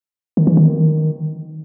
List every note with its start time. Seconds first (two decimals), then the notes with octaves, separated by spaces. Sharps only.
0.37 D#3
0.47 E3
0.57 D#3